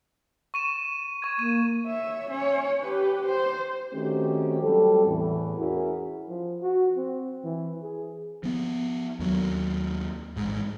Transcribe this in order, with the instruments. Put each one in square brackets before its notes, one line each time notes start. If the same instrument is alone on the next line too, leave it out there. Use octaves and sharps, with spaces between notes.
[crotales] C#6 D#7 E7
C#6 G#6
[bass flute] A#3 [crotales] D#7
[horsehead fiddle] C#5 E5
C#4 C#5
G4 B4
C5
[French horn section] D#3 A3 C4 C#4 F#4 G4
F#3 G3 C4 A4
E2 A2 E3
C#4 E4 F#4 G#4 A#4
[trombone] F3
F#4
C4
E3
G#4
[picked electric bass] F3 B3
D#2 F#3
A1 G#2